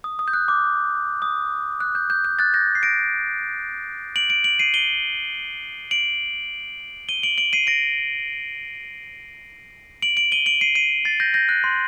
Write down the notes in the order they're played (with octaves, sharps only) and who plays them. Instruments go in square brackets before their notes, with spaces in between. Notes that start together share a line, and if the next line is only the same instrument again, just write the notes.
[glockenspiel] D#6
D#6
G6
F#6
D6
D#6
F#6
G6
G6
G6
F#6 A6
G6 A#6
C7
A#6 D7
D7 F#7
D7 F#7
D7 F#7
C7 D#7
D#7 G7
D7 F#7
D#7 G7
D7 F#7
D7 F#7
C7 D#7
A#6 D7
D7 F#7
D7 F#7
D#7 G7
D7 F#7
C7 D#7
C7 D#7
A6 C7
G6 A#6
G6 A#6
F#6
C6